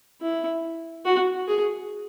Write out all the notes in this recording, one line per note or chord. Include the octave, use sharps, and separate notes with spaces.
E4
F#4
G#4